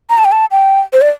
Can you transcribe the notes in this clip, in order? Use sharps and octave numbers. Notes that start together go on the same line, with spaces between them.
A#5
A5
G5
A5
G5
C5
D5